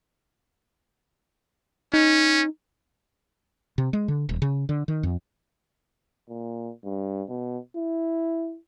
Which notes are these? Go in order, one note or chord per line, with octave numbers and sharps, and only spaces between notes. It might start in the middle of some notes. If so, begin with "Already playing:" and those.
C#4 D#4
C3
G#3
D3
D#1
C#3
D3
D#3
F2
A#2
G2
B2
E4